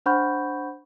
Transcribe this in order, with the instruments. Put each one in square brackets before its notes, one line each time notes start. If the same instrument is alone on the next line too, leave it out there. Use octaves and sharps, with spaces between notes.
[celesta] D4 C5 F#5 B5 C#6 G6